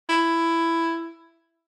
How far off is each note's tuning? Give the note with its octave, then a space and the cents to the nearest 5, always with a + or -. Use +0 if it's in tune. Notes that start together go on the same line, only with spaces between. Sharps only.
E4 +10